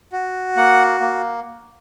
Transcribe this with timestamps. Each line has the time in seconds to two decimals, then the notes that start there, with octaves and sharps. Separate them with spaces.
0.12 F#4
0.57 A#3 F#5
1.00 A#3